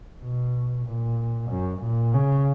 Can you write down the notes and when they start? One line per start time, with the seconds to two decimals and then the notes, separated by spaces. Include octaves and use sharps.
0.22 B2
0.86 A#2
1.50 F#2
1.82 A#2
2.14 C#3